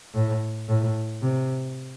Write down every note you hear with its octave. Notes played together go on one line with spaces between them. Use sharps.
A2
A2
C3